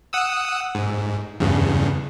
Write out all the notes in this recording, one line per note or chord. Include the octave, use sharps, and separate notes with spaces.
F#5 D#6 E6
G#2
E2 G2 C#3